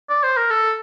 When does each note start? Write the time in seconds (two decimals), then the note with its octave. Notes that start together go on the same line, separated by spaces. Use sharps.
0.10 D5
0.23 C5
0.37 A#4
0.50 A4